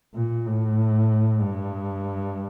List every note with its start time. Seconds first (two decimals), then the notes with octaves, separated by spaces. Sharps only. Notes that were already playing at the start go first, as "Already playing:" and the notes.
0.15 A#2
0.46 A2
1.41 G2